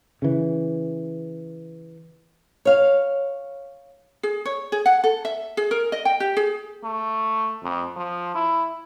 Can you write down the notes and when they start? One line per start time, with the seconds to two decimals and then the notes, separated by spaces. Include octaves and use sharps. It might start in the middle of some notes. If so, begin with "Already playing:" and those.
0.22 C#3 E3
2.65 C#5 F5
4.23 G#4
4.45 C#5
4.72 G#4
4.86 F#5
5.04 A4
5.25 E5
5.57 G#4
5.71 A#4
5.92 D#5
6.05 G5
6.20 G4
6.37 G#4
6.84 A3
7.63 F2
7.97 F3
8.35 E4